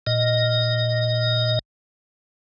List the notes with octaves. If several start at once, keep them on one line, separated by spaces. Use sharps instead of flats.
A#2 D#5